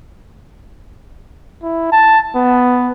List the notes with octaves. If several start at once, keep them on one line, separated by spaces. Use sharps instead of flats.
E4
A5
B3